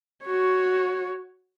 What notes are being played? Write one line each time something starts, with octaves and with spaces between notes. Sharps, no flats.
F#4 C#5